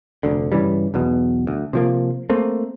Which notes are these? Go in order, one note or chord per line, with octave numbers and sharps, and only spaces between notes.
F1 D2 D3
G2 C#3 E3 G3
B1 E2 B2
D2
C3 F3 A#3
A3 A#3 C4